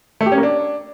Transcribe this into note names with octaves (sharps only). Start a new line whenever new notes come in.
A3
G4
C#4
A#3
D4